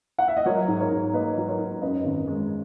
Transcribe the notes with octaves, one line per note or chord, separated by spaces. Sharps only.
F#5
E5
D#5
F#3 A#4 C#5
G#2
A#4 C#5
G#2
A#3 B4 D#5
F#3
A#4 C#5
G#2
F#2 B4 D#5
G#1
G#3